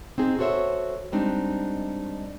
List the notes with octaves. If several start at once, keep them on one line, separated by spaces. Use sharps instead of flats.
C4 D#4 G#4
F#4 A4 C5 C#5 E5
G3 G#3 C4 D4 D#4